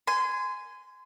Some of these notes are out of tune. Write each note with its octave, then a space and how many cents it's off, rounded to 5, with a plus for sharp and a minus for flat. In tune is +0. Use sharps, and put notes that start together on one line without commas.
G#5 +0 C6 -30